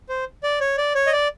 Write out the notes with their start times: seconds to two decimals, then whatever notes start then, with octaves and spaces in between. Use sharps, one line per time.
0.09 C5
0.43 D5
0.60 C#5
0.77 D5
0.95 C#5
1.07 D#5
1.12 D5